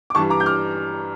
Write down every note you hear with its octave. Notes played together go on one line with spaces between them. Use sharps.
D6
G2 E3 G3 A5 C#6
A#5 D6
G6
D6 F6